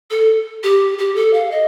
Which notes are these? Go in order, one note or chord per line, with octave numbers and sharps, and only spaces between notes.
A4
G4
G4
A4
F5
D#5